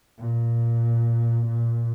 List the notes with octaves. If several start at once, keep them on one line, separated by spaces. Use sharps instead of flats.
A#2
A#2